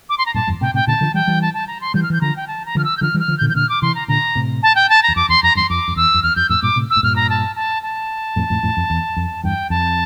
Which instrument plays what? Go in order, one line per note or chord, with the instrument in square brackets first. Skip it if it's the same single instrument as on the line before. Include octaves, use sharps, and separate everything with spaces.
[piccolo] D6
C6
A#5
[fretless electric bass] G2 A#2 [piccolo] A5
[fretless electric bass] E2 G2
[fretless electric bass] A2 C3 [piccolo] G5
[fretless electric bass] A2 C3 [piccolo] G5
[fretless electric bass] A#2 D3 [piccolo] A5
[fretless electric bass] D3 F3
[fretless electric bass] E3 G3 [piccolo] G5
[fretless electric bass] E3 G3
[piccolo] A5
A5
A#5
C6
[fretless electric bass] E3 G3 [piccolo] G6
[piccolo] F6
[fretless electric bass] E3 [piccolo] G6
[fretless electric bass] D3 F3 [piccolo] A#5
[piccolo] G5
A5
A#5
[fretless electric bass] D3 F3 [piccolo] F6
[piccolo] E6
G6
[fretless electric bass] D3 F3 [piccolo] F6
[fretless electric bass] E3 G3
[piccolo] F6
[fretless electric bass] D3 F3
[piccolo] G6
[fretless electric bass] A#2 D3
[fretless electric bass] E3 [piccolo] G6
[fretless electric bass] A#2 D3 [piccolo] F6
[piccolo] D6
[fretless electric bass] C3 E3 [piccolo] C6
[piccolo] A#5
[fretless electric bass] A#2 D3 [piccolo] A#5
[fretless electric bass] A2 C3
[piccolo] A5
G5
A5
A#5
[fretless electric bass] E2
[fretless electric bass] F2 [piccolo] D6
[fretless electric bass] E2 [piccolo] C6
[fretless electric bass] F2 [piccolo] A#5
[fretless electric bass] E2 G2 [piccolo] C6
[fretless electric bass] F2 [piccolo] D6
[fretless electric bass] F2
[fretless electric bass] E2 [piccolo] E6
[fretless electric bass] F2
[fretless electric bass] E2 [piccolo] F6
[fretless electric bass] F2 [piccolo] G6
[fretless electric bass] F2 A2 [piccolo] E6
[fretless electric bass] G2 A#2 [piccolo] D6
[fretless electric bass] A2 C3
[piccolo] E6
[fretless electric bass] A2
[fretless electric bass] G2 A#2 [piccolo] F6
[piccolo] A#5
A5
A5
A5
[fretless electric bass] F2 A2
F2 A2
F2 A2
F2
E2
F2
[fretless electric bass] E2 G2 [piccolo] G5
[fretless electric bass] F2 [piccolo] A5